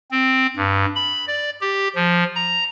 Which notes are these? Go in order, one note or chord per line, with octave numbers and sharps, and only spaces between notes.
C4
G2
B5
D5
G4
F3
A#5